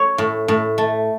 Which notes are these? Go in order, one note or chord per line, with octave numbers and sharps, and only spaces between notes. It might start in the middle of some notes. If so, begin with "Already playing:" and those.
Already playing: C#5
A2
A2
A3